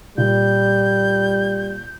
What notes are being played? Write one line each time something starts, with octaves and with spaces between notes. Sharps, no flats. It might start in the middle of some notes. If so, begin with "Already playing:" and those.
A#2 G3 G6